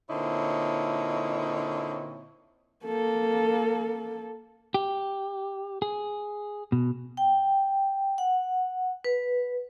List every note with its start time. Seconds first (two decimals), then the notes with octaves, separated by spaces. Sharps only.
0.09 A#2 D3 C4 D#4 E4 C#5
2.85 A#3 A4
4.74 G4
5.82 G#4
6.72 B2
7.17 G5
8.18 F#5
9.04 B4